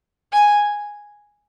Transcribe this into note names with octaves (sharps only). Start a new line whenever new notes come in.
G#5